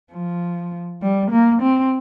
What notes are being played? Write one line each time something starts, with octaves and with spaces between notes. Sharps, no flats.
F3
G3
A#3
C4